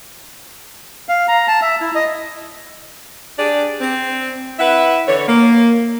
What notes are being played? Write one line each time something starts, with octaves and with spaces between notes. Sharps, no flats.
F5
A#5
A5
E5
E4
D#5
D4 G4 G#4 D5
C4
E4 B4 E5 F#5
D3 E3 C#5
A#3